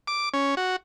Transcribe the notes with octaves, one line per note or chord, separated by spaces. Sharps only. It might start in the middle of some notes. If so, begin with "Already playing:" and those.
D6
C#4
F#4